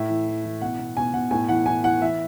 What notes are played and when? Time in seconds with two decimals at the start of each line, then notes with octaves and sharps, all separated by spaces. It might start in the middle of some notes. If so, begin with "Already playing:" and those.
Already playing: A2 E5
0.09 E3
0.27 E3
0.44 E3
0.61 B2 F#5
0.79 B2
0.97 B2 G#5
1.14 B2 F#5
1.31 A2 G#5
1.49 E3 F#5
1.66 E3 G#5
1.84 E3 F#5
2.02 E3 E5